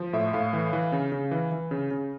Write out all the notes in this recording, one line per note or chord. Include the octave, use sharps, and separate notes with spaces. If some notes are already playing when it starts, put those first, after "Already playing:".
Already playing: F3
A2 E5
A2 F5
E3
E3
C#3
C#3
E3
E3
C#3
C#3